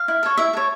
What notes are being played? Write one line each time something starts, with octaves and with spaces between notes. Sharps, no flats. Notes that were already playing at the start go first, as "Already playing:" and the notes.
Already playing: F5
E4
A4 C#5
E4 E5
A4 C#5